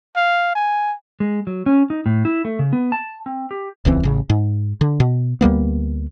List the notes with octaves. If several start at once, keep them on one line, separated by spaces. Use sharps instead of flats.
F5
G#5
G#3
F#3
C#4
D#4
A2
E4
A3
C#3
B3
A5
C4
G4
D#1 C#2 E3 C4
A1 C#3
G#2
D3
B2
D2 G3 A#3 B3